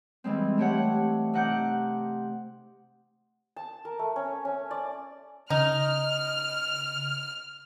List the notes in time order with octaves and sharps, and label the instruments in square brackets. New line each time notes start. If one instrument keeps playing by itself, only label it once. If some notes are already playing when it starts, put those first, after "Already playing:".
[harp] E3 G3 G#3 C4
A3 G4 C#5 F#5
C3 D#4 F#5 D6 G6
[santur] A5
A#4
A3
C#4
C#4
D5
[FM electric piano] C#3 [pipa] D#4 [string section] F6